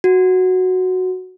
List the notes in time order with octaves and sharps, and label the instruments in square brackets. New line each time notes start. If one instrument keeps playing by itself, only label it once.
[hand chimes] F#4